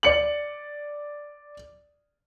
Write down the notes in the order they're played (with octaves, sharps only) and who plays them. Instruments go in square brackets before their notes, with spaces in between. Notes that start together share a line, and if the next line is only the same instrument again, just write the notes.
[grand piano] D5 C#7 F#7